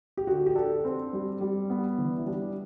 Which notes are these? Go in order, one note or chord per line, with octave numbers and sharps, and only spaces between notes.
G4
D3 F#4
G4
D4 A4
C4
G3
G3
B3
E3 D4
E4
G3 D4